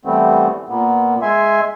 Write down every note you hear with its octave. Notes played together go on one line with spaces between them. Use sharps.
E3 G3 A3 B3 C4
A#2 A#3 B3
G#3 E5 G#5 C6